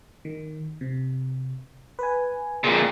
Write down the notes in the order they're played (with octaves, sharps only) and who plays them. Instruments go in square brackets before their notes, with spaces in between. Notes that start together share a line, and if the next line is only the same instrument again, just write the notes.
[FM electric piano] D#3
C3
B4 G#5
[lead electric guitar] F2 A#2 [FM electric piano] G#4 G5